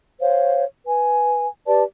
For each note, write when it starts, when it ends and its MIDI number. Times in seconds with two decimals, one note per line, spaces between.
0.21 0.64 72
0.21 0.64 73
0.21 0.64 77
0.86 1.46 71
0.86 1.46 80
1.67 1.83 67
1.67 1.83 71
1.67 1.83 74
1.67 1.83 81